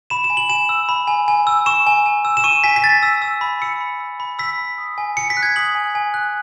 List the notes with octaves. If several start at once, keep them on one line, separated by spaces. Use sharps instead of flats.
B5 E7
E7
G#5
F#7
G#5 E7
E6
B5
G#5
G#5
E6
C#6 E7
G#5
G#5
E6
E7
C#6 D#7
G#5 B6
B6
G#5 A6
E6
E6
B5
E6 C#7
B5
E6
B5
E6 B6
B5
D#6
G#5
G#5 C#7
B6
F#6
G#6
D#6 F#7
G#5
G#5
F#6